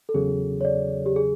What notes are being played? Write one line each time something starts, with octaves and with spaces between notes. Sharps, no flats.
A4
E2 C#3 F#3 G#4
C#5
D5
G4
G#4